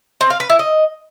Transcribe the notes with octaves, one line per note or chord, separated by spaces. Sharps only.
C4
F5
B4
E4
D#5